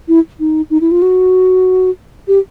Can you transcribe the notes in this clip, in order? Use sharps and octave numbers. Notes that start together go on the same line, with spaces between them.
E4
D#4
D#4
E4
F4
F#4
G4